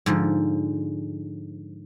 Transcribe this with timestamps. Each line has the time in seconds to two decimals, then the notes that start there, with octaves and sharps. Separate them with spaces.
0.06 G#2 D3 F3